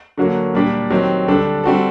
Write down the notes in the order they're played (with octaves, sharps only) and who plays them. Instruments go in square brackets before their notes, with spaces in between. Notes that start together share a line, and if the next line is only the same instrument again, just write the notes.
[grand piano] D3 F#3 A#3 F#4
A#2 G3 A#3 D4 G4
D#3 F#3 C4 G4
D3 G3 D4 A4
G3 C4 F#4 A4